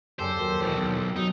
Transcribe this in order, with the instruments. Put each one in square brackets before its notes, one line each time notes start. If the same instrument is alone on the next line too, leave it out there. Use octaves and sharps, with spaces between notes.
[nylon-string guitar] F#2 C#3 D5 [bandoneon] G4 A4 [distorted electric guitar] C5
[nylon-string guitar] D#2 F#3
[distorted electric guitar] E2 B2
B1
[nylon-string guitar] F#3 [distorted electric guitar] D#4